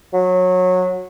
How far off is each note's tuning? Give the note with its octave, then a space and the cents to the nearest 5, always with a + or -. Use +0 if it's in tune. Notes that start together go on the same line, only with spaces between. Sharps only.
F#3 -20